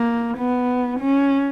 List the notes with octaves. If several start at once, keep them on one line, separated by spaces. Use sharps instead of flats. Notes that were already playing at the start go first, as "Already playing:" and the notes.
Already playing: A#3
B3
C#4